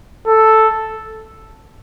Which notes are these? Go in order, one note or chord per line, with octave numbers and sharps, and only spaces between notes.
A4